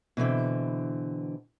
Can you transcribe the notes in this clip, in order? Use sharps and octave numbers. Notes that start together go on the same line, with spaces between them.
B2 D3 E3 C4